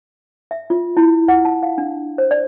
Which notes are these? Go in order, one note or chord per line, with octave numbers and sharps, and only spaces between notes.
E5
F4
E4
F#5
A5
F5
D4
C5
D5